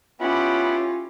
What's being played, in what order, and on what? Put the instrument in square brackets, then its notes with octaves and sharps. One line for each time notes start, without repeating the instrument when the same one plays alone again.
[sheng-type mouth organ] B3 F#5 B5 [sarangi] C#4 [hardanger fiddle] E4 G4 [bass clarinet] F4